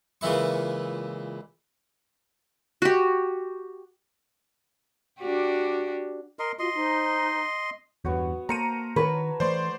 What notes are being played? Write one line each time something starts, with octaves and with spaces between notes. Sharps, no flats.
C#2 A#2 E3 E4 C#6
F#4 G4
D4 F#4 G4
A#4 D#5 C6
F4 F#4 D#5 C6
D#4 C5
E2 G2 B3 F#4 C#5
A#3 A#4 C5 A5 A#5 C#7 D#7
D#3 B4 C#5 A5
E3 A3 C5 D5 C6